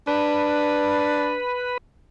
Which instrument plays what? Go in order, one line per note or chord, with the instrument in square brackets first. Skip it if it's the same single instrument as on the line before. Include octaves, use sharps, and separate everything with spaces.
[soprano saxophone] D4 [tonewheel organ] B4